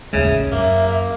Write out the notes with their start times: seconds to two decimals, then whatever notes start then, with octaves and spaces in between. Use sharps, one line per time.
0.13 A1 D#2 C#3 G#3 E5
0.52 F#2 A#3 E5